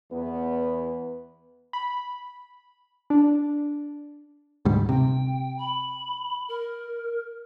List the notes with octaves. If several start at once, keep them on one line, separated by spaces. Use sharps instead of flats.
E2 B3
B5
D4
D2 G#2 G3
C3 G5
B5
A#4